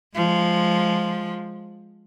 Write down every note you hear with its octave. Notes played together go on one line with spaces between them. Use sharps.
F3 G#3